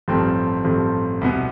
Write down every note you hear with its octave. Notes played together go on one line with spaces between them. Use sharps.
A1 G2 F3 A3 C4
A1 G2 F3 A3 C4
C2 B2 B3